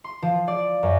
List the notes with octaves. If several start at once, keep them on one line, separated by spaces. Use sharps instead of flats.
C6
F3
D5
F#2